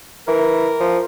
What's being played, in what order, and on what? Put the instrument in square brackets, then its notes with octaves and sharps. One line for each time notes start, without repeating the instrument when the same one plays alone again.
[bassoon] E3 [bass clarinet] A#4
[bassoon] F3